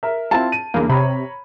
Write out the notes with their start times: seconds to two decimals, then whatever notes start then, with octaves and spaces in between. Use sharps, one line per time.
0.03 A#4 E5
0.31 C4 E4 F4 A5
0.52 D#7
0.74 E2 G2 C#3 A#3
0.89 C3 C#5 A#5 B5